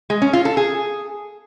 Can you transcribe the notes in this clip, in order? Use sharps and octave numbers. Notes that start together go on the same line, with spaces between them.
G#3
C#4
F4
A4
G#4